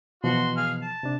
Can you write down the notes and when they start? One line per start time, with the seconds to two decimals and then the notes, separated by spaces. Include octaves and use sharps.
0.24 B2 E3 F3 F#4 C6
0.57 G#4 F5
0.82 A5
1.03 C3 D4